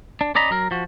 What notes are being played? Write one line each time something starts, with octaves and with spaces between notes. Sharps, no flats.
D4
C#4 D5 D#5 A#5 B5
F#3 A#4
F3 F#4